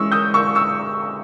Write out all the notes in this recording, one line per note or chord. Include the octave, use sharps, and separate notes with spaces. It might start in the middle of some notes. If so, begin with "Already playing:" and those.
Already playing: E3 G#3 C#4 C#6 E6
D#6 G6
C#6 E6
C#6 E6